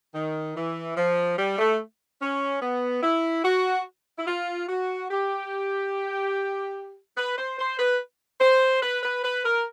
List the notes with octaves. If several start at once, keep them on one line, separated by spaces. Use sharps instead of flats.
D#3
E3
F3
G3
A3
C#4
B3
E4
F#4
E4
F4
F#4
G4
B4
C5
C5
B4
C5
B4
B4
B4
A#4